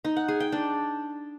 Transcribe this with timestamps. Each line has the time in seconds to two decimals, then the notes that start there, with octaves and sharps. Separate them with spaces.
0.05 D#4
0.16 F#5
0.28 G#4
0.40 G5
0.52 D4